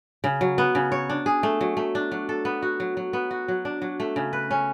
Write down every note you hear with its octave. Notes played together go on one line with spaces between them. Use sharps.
C#3
F#3
B3
C#3
C#5
D4
G#4
A3
F#3
A3
D4
F#3
A4
B3
F#4
F#3
F#3
B3
F#4
F#3
D4
F#3
A3
C#3
B4
C#4